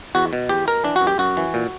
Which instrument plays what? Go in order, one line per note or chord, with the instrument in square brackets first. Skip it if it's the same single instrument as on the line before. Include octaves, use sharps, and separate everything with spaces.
[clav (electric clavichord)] E2 F#4
B2
E2 G4
B2 A#4
E3 D4
F#4
F#2
G4
F#2 F#4
E3
A#2